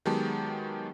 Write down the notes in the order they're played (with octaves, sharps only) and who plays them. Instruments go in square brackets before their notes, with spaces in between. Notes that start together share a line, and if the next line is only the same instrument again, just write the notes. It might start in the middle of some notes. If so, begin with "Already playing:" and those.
[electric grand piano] D#3 F#3 G#3 B3 G4 A5